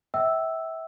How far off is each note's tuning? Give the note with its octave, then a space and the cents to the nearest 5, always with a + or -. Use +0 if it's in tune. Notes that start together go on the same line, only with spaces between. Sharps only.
E5 -20 G5 -35 E6 +0